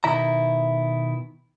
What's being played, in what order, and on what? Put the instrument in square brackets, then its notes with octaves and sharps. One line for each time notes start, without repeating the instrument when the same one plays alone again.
[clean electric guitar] B2 D#3 E4 E5 A#5